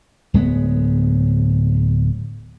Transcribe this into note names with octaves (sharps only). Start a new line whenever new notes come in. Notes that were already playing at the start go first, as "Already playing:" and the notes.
D1 G#3 B3